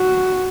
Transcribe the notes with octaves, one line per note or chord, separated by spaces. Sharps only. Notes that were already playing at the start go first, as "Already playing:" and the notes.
Already playing: F#4